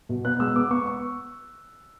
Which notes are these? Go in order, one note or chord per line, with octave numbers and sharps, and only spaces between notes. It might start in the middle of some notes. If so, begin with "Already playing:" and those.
B2
B3 F#6
G#3 E6
B3 D6
B3 C#6
C#6